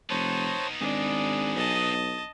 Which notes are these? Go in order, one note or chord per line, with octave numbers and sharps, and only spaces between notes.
F1 B3 D#4 C5 C#5 A5
G#1 D4 G#4
B1 D#5 A5